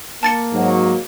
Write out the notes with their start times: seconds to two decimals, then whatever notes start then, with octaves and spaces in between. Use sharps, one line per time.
0.23 A#3 A5 A6 C#7
0.53 G#2 F#3